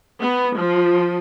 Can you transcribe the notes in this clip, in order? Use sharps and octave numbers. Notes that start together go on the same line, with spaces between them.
B3
F3